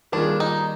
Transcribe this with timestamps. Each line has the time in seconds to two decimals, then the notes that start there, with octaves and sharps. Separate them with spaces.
0.12 D#3 G3 A#3 D4 F4 G#4
0.40 D#4